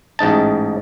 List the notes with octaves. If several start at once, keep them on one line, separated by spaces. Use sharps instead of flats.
A1 G#2 D#4 A5